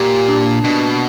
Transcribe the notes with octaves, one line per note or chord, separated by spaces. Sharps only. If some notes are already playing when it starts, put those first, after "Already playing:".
Already playing: A#2 G4
D4
B2 D4